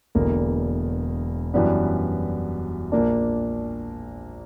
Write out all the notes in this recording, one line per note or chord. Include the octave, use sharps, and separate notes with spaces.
E1 E2 D3 A#3
F#2 E3 G3 B3 D4
A#1 A#2 A#3 D4